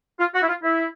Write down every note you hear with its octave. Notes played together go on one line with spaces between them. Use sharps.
F4
F#4
E4
F4
E4